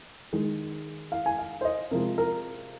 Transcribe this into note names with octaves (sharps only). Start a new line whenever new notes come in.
D#3 G#3
F5
G#5
F5
C5
D#5
C3 F3 G#3 A#4
A#4